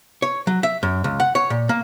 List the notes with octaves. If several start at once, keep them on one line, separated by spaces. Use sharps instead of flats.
C#5
F#3
E5
F#2
C#2
F#5
C#5
A#2
A#3